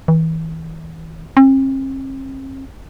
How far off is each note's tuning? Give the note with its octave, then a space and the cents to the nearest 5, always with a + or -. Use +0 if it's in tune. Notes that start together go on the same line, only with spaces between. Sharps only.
E3 -35
C4 +45